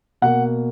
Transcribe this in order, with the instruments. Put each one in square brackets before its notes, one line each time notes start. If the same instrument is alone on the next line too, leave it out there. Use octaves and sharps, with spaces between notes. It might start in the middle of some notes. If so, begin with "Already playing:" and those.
[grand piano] B2 A#3 F#5